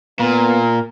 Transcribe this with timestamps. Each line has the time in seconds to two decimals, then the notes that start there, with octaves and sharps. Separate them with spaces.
0.19 A#2 B3 A#4